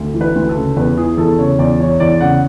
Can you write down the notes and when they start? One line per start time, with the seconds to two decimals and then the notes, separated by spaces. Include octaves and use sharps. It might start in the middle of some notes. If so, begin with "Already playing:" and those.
Already playing: D2
0.14 E3
0.21 B4
0.35 D2
0.49 A4
0.56 C#3
0.76 E2 B4
0.97 E3 G#4
1.17 E2 A4
1.38 C#3 C#5
1.59 E2 D5
1.79 E3 C#5
2.00 E2 D5
2.20 C#3 F#5